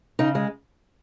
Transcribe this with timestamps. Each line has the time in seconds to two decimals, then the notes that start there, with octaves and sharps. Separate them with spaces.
0.19 C#3 D#4
0.35 G#3